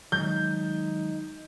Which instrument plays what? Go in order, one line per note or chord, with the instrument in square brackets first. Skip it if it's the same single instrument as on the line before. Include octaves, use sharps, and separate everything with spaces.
[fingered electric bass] D#3 F#3 G#3 [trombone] D#4 [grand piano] G6